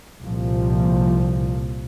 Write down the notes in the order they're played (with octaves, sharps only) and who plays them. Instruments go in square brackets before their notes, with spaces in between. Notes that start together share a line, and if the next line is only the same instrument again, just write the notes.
[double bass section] C2 A#2 F3